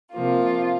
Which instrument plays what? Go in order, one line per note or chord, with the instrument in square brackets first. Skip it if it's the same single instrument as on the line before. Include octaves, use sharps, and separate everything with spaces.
[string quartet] C3 F3 A#3 F4